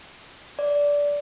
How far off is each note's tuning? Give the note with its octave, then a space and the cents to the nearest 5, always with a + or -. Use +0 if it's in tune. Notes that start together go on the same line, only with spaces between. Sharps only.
D5 -15